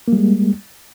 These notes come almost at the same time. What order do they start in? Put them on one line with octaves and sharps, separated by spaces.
A#3 G3 G#3